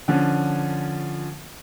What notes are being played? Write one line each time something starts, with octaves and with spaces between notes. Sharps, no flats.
D3 F3 C#4